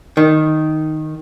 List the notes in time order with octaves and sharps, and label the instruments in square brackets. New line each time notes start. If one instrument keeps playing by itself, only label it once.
[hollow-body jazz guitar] D#3